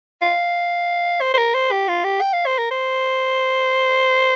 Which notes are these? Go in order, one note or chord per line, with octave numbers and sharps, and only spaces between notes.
F5
C5
C5
A#4
C5
G4
F4
G4
G5
F5
C5
A#4
C5